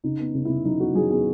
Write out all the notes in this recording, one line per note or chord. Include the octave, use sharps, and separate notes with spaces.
C#3 D#4
B3
C#3
C#3 E4
F#3 D#4
B3 F#4
F#3 G#4
B3 G#4